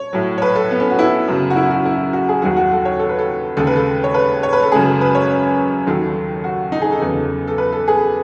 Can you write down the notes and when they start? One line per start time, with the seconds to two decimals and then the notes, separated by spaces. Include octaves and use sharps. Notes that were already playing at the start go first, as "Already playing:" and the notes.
Already playing: C#5
0.13 A2 F#3
0.38 C#5
0.42 B4
0.56 A4
0.71 B3
0.80 C#4
0.91 F#4
0.99 E4
1.28 F#2 C#3 F#3
1.50 F#4
1.56 E4
1.71 F#4
1.85 E4
2.13 F#4
2.29 G#4
2.42 D#2 D#3 F#3 F#4
2.57 F#4
2.72 A4
2.85 C#5
2.99 A4
3.09 B4
3.19 A4
3.57 D#2 C#3 G#3 A4
3.67 B4
3.76 A4
4.04 C#5
4.14 B4
4.43 C#5
4.53 B4
4.62 A4
4.72 F#2 C#3 G#3 G#4
5.01 B4
5.15 C#5
5.87 D#2 D#3 F#3 A4
6.44 F#4
6.72 D#4
6.82 G#4
6.92 A4
7.01 E2 C#3 F#3
7.48 A4
7.58 B4
7.72 A4
7.88 G#4